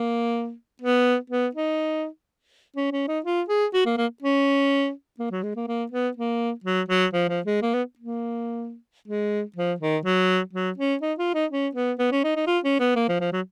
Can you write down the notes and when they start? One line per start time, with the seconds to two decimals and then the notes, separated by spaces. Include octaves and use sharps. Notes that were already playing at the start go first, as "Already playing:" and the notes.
Already playing: A#3
0.82 B3
1.30 B3
1.55 D#4
2.76 C#4
2.92 C#4
3.08 D#4
3.25 F4
3.48 G#4
3.74 F#4
3.86 A#3
3.98 A#3
4.22 C#4
5.19 A#3
5.31 F#3
5.43 G#3
5.56 A#3
5.67 A#3
5.92 B3
6.17 A#3
6.64 F#3
6.89 F#3
7.13 F3
7.29 F3
7.46 G#3
7.62 A#3
7.74 B3
7.99 A#3
9.08 G#3
9.56 F3
9.80 D#3
10.05 F#3
10.53 F#3
10.78 C#4
11.02 D#4
11.19 F4
11.34 D#4
11.51 C#4
11.75 B3
11.99 B3
12.12 C#4
12.24 D#4
12.36 D#4
12.47 F4
12.64 C#4
12.80 B3
12.96 A#3
13.09 F3
13.20 F3
13.32 F#3